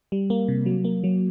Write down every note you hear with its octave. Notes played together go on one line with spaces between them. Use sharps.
G3
A#3
C3
F#3
A#3
F#3